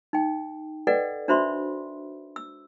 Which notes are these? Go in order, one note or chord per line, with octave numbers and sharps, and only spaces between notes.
D#4 G5
A4 B4 D5 D#5 F#5 G5
D4 F#4 C5 E5 B5 C6
E6